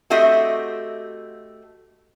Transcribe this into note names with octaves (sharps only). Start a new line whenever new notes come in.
A3 C4 F#4 G4 D#5 E5